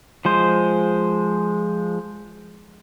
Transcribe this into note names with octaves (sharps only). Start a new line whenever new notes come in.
F3 G#3 C5